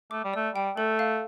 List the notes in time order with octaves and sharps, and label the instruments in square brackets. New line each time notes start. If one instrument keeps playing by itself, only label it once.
[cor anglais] A3 [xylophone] D6
[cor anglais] G3
[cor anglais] A3 [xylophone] D5
[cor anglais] G3 [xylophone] G5
[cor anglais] A3 [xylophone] A4
[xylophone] F5